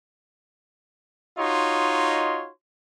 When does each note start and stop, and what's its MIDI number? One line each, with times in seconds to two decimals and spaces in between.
1.38 2.49 63
1.38 2.49 65
1.38 2.49 66
1.38 2.49 73
1.38 2.49 75
1.38 2.49 84